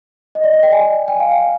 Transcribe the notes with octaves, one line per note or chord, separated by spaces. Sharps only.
D#5
D5
D#5
G5
G#5
G5
F5
G5